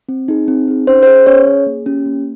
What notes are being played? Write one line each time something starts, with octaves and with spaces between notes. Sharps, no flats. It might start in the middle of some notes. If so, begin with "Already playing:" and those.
C4
D#4 G#4
C4
D#4 G#4
C#4 C5
C5
G#4
C#4 C#5
G#4
A#3
C#4 G4
A#3